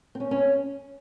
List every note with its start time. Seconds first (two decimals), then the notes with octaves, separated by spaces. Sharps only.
0.15 C4
0.20 C#4
0.31 C#4